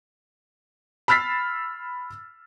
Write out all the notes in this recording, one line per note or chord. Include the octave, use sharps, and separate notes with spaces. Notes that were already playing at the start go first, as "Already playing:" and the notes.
B5 E6 F6 A6 B6 C7